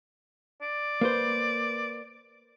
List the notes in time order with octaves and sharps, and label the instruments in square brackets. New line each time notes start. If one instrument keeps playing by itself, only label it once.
[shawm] D5
[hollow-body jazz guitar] A#3 B4 C5